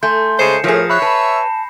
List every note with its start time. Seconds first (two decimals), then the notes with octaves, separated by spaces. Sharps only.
0.03 A3 G#5 C6 G6
0.39 C#3 G#3 C5 C7 C#7 E7
0.64 A2 F3 G#4 A#4 G6 A#6
0.90 C#5 E5 B5 F#6
1.02 B4 A5